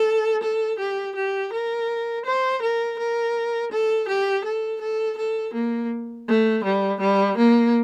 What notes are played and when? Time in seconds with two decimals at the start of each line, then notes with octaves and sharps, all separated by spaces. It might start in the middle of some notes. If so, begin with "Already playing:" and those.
Already playing: A4
0.43 A4
0.79 G4
1.16 G4
1.53 A#4
2.26 C5
2.62 A#4
2.99 A#4
3.72 A4
4.08 G4
4.45 A4
4.81 A4
5.17 A4
5.54 A#3
6.28 A3
6.64 G3
7.01 G3
7.38 A#3